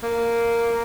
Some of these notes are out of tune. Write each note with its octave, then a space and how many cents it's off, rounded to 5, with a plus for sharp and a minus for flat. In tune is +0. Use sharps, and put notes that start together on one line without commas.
A#3 -5